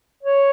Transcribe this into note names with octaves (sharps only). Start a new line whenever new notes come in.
C#5